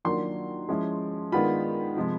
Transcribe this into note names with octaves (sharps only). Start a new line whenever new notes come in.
D#3 F#3 A#3 D4 F4 C6
F3 G#3 C#4 E4
D#3 G#3 B3 D4 F4 B5
C3 F3 G#3